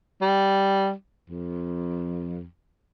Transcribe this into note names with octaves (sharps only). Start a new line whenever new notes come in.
G3
F2